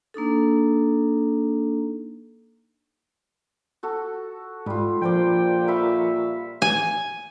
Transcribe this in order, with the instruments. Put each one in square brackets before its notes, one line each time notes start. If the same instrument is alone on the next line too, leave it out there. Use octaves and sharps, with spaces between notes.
[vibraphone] A#3 D4 D#4 A4
[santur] F#4 A4
[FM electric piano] G#2 [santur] G3 F4
[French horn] A#2 [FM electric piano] F3 [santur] D4 C5 D5 [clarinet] G5
[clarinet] E5 [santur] F5 B5 C#6
[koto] G#5